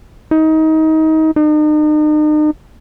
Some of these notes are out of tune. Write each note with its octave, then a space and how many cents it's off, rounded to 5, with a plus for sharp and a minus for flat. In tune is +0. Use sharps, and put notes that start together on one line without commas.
D#4 +25
D#4 -40